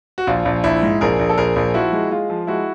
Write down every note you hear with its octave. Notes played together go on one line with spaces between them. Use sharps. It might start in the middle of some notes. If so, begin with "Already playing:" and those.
F#4
A#1 F4
A#1
A#1 E4
G#2
A#1 G#4 A#4
A#1
A4
A#1 G#4 A#4
A#1
F3 E4 F#4
G#3
G#3 F4
F3
G#3 E4 F#4